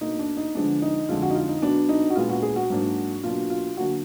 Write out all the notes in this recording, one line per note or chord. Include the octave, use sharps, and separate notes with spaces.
B2 A#3 D4 D#4
D4
D#4
D3 F3 G#3 B3 D4
D#4
F2 D3 G#3 D4 F4
F#4
D#4
F4
D#4
B2 F#3 B3 D4
D#4
F#4
A#2 G#3 B3 D4 F4
F#4
G#4
F#4
G#2 F#3 A#3 D4
B2 F#3 A#3 D4 F4
F4
D3 F#3 A#3 D4 F#4